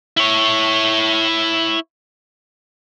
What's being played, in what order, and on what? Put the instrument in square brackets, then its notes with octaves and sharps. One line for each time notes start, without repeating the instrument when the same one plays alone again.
[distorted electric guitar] E4 C#5